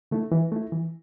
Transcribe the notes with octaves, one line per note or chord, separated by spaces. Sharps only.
D3 A3 E4
E3
A3 E4
E3